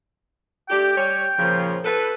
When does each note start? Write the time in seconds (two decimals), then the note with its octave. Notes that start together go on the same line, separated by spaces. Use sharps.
0.69 A3 D4 G4 G5
0.97 G3 C#5
1.37 A#2 C#3 F3
1.83 A4 B4